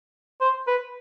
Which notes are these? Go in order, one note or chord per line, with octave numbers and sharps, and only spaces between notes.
C5
B4